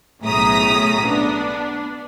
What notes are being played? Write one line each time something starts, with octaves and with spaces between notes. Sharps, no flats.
B1 A2 C#3 A#5 D#6 B6
B3 D4